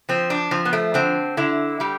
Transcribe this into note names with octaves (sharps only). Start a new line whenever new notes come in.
F3 C4
D4
F3 C4
B3
A3
D3 C4
D3 E4
G3 G4